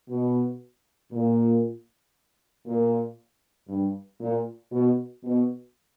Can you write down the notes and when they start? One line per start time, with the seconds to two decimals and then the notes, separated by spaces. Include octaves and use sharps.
0.09 B2
1.12 A#2
2.66 A#2
3.69 G2
4.20 A#2
4.72 B2
5.23 B2